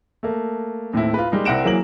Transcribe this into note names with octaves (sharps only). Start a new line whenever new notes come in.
A3 A#3
D#2 A2 C4 E4
F4 B4
G3 G#3 A#3 D#4
C2 C4 F#5 A#6 D7 E7
E3 F#3 A#3 G#4 F#7